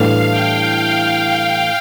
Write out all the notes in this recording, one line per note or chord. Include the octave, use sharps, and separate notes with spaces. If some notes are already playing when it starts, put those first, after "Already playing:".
Already playing: A2 E3 G3 D4 A4 F5
G5
F5